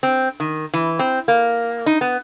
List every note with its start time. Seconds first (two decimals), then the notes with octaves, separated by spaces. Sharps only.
0.03 C4
0.40 D#3
0.74 E3
0.99 C4
1.28 A#3
1.86 D#4
2.01 B3